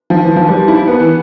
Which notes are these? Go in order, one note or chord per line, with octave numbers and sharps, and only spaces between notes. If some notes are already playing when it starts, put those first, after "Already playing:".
F3
E3
F3
G3
E4
B3
E3